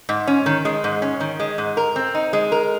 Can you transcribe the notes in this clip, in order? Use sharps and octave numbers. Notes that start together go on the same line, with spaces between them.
G#2
C#4
D#3
G#3
G#2
C#4
D#3
G#3
G#2
A#4
C4
D#4
G#3
A#4